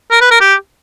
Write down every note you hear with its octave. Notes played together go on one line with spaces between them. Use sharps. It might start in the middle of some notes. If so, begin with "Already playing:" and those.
A#4
B4
A#4
G4